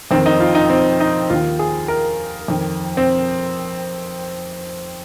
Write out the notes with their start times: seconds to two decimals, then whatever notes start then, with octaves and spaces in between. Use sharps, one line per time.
0.11 F2 D#3 C4
0.26 D#4
0.40 F4
0.55 D#4
0.70 C4
1.00 D#4
1.30 D#2 D#3 F4
1.59 G#4
1.88 A#4
2.48 F2 D#3
2.97 C4